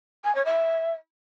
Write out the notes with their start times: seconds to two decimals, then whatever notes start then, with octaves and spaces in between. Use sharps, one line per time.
0.24 G#5
0.35 C#5
0.45 E5